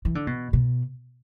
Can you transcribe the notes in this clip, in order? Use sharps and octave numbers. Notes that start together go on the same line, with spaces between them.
E3
D3
B2
B2